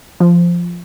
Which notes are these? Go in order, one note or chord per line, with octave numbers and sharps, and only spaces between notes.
F3